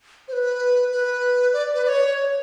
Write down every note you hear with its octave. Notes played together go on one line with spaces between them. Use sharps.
C5
B4
B4
D5
B4
D5
C#5